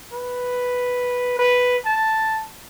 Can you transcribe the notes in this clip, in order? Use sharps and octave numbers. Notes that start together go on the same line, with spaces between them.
B4
B4
A5